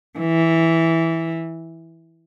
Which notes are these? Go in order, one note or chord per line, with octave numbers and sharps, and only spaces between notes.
E3